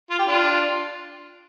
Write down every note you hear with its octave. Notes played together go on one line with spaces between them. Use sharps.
F4
G4
D4 F4